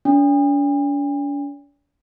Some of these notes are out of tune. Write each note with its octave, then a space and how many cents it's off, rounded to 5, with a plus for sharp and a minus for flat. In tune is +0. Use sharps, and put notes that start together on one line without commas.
D4 -45